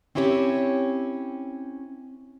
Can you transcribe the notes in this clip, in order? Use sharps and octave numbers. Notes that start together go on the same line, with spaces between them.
C4 C#4 E4 G4 C5 C#5